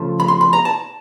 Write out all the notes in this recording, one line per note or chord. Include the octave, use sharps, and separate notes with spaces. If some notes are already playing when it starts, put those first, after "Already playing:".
Already playing: C#3 F3 A3
B5
C6
B5
A#5
A5